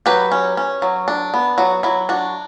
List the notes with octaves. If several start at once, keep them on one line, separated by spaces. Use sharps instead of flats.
F#3 G4 B4
C#4
C#4
F#3
D4
B3
F#3 F#4
F#3 E4
D4 F#4